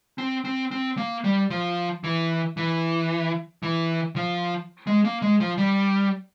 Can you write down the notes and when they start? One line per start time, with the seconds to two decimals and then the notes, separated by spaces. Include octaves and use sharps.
0.18 C4
0.45 C4
0.71 C4
0.98 A#3
1.24 G3
1.50 F3
2.04 E3
2.57 E3
3.63 E3
4.16 F3
4.87 G#3
5.05 A#3
5.22 G#3
5.40 F3
5.58 G3